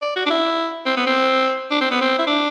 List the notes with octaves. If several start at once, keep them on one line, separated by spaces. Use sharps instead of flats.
D5
F#4
D4
E4
C4
B3
C4
D4
C4
B3
C4
E4
D4